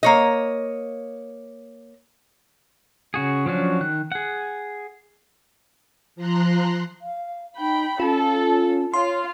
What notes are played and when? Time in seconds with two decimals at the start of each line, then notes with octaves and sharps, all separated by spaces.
0.03 A#3 C#5 D#5
3.14 C#3 F#4 G#4
3.46 F3 F#3 C#4 D4 F#4
3.81 D#3 F#6
4.12 G#4 F#5
6.16 F3 A#5 C6 F#6
7.02 F5
7.59 D#4 G5 B5
8.00 C#4 F4 A4
8.94 F4 C#5 F5 C6